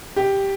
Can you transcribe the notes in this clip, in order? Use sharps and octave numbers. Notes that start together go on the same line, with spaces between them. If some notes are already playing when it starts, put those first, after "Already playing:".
G4